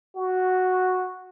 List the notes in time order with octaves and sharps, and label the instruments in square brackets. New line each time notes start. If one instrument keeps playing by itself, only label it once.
[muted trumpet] F#4